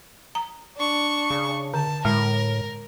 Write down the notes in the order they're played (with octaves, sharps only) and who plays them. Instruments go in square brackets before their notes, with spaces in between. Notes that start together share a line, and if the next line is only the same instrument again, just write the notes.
[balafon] A#5
[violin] D4 C#6
[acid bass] C#3
[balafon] D3 [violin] A5
[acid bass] A2 [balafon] G#3 [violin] A#4